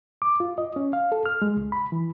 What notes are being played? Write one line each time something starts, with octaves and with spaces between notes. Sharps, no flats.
D6
F4
D#5
C#4
F5
A4
F6
G#3
C#2
B5
E3